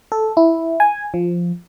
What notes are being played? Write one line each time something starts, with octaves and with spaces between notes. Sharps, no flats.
A4
E4
G#5
F3